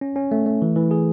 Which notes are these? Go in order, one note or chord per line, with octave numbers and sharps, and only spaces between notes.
C#4
C#4
A3
A3
E3
E3
G#4